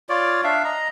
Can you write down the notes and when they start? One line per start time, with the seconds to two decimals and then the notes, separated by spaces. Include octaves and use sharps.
0.09 F4 C#5 D5
0.44 D4 E5 F5
0.64 D#5 A#5